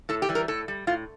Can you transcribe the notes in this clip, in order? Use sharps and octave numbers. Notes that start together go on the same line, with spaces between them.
A2 A4
G4
E3 G3
A#4
A2 A4
G3
A2 F4